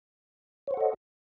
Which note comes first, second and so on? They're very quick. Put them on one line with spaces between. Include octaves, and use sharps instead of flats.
C#5 C5 F#5 A4 D#5